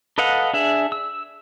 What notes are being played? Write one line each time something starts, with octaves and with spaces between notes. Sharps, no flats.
A4 B4 D#5 F5 F#5
D4 G#4 E5
E6